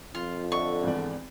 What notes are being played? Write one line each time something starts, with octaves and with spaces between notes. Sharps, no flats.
F2 F4
D3 D#5 E5 C#6
G#1 E2 D5